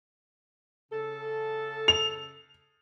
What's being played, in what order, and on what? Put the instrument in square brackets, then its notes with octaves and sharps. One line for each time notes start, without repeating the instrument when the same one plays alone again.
[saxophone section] C#3 A4
[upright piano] F7